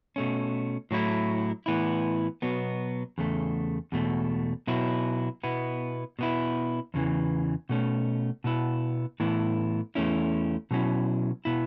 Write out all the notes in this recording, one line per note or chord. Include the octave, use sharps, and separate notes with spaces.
B2 A3 C#4
A2 F#3 A3 E4
A2 E3 B3 E4
B2 F#3 B3
E2 C#3 A3
E2 B2 A3
B2 F#3 B3 E4
B2 B3 E4
B2 B3 E4
E2 C#3 E3
B2 A3 C#4
B2 B3 E4
A2 E3 B3 E4
E2 B2 A3 C#4 E4
B2 F#3 C#4 E4
B2 B3 E4